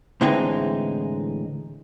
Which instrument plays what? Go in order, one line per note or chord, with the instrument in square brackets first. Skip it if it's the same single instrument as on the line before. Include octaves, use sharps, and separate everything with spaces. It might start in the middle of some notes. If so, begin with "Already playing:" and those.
[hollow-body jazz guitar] A2 D3 E3 G#3 C4 D#4